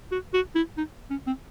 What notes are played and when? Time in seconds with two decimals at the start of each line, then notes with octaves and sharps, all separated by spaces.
0.12 F#4
0.34 F#4
0.55 E4
0.77 D#4
1.10 C#4
1.27 C4